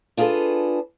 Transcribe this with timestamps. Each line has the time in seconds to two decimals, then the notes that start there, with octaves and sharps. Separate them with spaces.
0.17 D4 F4 G#4 A4 B4